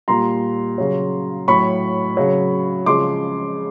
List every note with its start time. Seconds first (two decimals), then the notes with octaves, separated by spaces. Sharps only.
0.08 A#2 G3 A#5 C6
0.78 C#3 F#3
1.48 A2 F#3 B5 C#6
2.17 C#3 F#3
2.86 C#3 F3 G#3 C6 D6